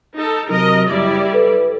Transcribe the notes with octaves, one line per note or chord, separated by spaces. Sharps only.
D#4 A4
C3 F#3 A#4 D#5
F#1 G3 E4 D5
A4 B4